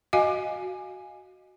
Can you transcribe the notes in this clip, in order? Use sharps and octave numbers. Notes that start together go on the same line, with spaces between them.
F#4 D#5 F5 G#5